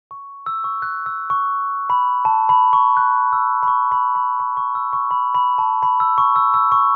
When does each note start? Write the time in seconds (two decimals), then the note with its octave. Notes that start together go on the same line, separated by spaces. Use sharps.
0.11 C#6
0.46 E6
0.64 C#6
0.82 F#6
1.06 E6
1.30 C#6
1.90 B5
2.25 A5
2.49 B5
2.73 C#6
2.97 F#6
3.33 E6
3.63 B5
3.68 C#6
3.92 B5
4.15 B5
4.40 C#6
4.57 C#6
4.75 E6
4.93 C#6
5.11 B5
5.35 B5
5.58 A5
5.83 B5
6.00 E6
6.18 C#6
6.36 E6
6.54 E6
6.72 C#6